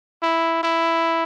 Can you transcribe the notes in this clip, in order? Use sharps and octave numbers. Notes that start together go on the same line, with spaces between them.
E4
E4